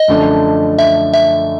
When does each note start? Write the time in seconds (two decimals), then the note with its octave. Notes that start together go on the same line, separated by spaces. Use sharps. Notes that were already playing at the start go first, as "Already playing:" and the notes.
Already playing: D#5
0.08 F#2 D3 F3 A3 D4
0.79 E5
1.13 E5